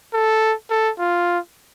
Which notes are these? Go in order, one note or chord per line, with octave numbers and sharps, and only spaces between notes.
A4
A4
F4